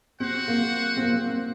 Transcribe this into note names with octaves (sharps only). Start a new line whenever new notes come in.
C4 F#4 C5 F#5
A#3
C4
A#3